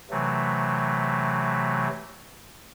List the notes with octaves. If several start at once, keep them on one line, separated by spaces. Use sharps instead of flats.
C3 E3 F#3 A3